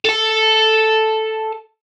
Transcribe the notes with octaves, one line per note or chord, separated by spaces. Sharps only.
A4 A5